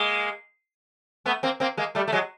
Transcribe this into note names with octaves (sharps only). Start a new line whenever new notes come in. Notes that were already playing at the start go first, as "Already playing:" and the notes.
Already playing: G#3 A#3
A3 B3
A#3 C4
A#3 C4
G#3 A#3
G3 A3
A3
F#3 G#3